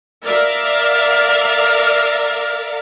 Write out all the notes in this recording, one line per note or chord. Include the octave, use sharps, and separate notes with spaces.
A#4 D5 E5 F5